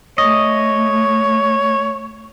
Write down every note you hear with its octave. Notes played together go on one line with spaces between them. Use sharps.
A3 C#5 D#5